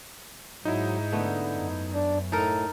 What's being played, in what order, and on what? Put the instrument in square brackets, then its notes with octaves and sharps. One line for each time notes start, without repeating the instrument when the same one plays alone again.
[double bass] G#2 [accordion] F#3 [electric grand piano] D#4 E4
[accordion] D3 [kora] A3 B3
[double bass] F#2
[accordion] D4
[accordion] A2 [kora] D#4 A4 A#4